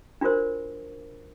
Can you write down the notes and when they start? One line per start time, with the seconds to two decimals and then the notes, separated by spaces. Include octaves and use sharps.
0.21 D4 F4 F#4 A#4 C5